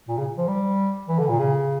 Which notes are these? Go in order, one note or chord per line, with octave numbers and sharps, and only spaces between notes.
A#2
C#3
F3
G3
E3
D3
A#2
C#3